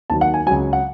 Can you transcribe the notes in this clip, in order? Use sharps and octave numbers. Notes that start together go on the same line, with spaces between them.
D#2 D#3 F#3 A5
F#5
G#5
C#2 C#3 F#3 G#5
F#5